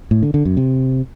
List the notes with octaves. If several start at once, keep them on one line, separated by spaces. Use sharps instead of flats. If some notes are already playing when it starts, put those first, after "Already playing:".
A2
D3
D3
F#2
C3